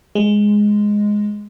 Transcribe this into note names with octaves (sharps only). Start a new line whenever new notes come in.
G#3